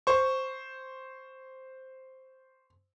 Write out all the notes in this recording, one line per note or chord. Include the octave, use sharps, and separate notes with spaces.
C5 C#6